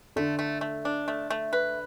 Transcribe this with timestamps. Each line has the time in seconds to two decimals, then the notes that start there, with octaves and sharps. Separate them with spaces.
0.16 D3 A3
0.39 A3
0.61 A3
0.85 D4
1.08 A3
1.30 A3
1.53 B4